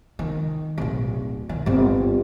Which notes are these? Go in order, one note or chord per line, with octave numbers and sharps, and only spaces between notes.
D#3
D1 B1
D#3
G1 C4